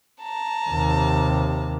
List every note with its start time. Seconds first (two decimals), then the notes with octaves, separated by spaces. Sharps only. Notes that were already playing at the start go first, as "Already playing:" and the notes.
0.22 A5 A#5
0.70 D#2 C3